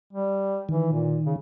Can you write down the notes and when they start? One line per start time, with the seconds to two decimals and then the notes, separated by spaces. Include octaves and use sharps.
0.13 G3
0.69 D#3 E3
0.92 A#2
1.26 C#3